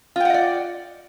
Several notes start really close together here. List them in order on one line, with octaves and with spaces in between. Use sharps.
F4 G5 F#5 D#5 D5